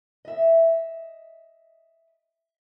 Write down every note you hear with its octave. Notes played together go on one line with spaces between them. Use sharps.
D#5 E5